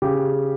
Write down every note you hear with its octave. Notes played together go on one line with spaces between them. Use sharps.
C#3 G4